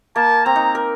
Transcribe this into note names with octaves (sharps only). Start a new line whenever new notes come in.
A#3 A5
C4 A#5
D#4
A#4